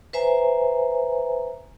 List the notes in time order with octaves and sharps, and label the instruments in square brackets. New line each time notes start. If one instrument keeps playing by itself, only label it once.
[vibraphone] B4 C5 E5 G#5 A#5